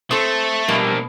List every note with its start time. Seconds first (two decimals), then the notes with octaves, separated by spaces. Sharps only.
0.11 A3 C4 A4 C6 D#6
0.69 B2 G3 A#3 D4